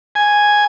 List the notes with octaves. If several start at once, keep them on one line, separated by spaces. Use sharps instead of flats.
G#5